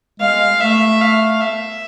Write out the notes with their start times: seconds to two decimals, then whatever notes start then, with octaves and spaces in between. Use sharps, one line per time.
0.20 G#3 F5
0.60 A3 E5
1.01 F5
1.41 E5